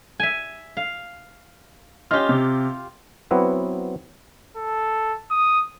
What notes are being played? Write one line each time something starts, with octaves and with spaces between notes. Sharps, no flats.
E5 G#5
F5
C#4 F4 G4 D#5 F6
C3
F#3 B3 C4 E4 B4
A4
D#6